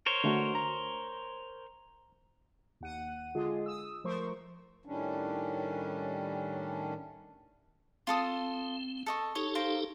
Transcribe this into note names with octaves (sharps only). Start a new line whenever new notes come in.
A#4 C5 C#5
D3 A3 F#4
A#5
D#2 F#5 D#7
D3 G#3 F4 G#4
D#6 E6
F3 A3 A#4 C5 C6 C#6
A2 D#3 G3 C#4 D4
C4 F4 A4 D#6
A4 D#5 C#6
D#4 G4 A4 C#5
A#4 C5 F5